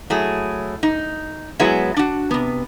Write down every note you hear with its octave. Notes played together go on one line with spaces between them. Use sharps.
F#3 A3 E4 G#4
D#4
F#3 G#3 B3 E4 G#4 E5
D4 F#4
C3 B3